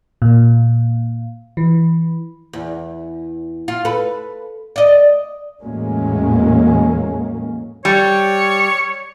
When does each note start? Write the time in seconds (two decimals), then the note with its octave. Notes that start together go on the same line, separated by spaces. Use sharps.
0.22 A#2
1.57 E3
2.53 E2
3.68 F4
3.85 A4 B4
4.76 D5 D#5
5.61 E2 A2 F#3 G#3 A#3 C#4
7.85 G3 C#5